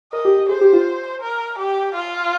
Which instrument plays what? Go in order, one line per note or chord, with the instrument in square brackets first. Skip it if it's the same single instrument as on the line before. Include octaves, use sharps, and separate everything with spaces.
[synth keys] A#4 [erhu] D#5
[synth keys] G4
G4
[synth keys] G#4 [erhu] C5
[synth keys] G4
F4
[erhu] A#4
G4
F4